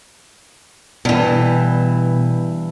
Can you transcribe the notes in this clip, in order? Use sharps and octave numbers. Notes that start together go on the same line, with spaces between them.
G2 B2 E3